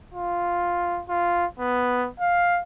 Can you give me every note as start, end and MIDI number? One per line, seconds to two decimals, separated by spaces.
0.14 1.02 65
1.09 1.46 65
1.59 2.08 59
2.20 2.61 77